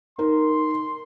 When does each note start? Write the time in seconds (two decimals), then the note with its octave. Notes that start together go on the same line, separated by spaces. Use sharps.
0.18 D#4 A#4 C6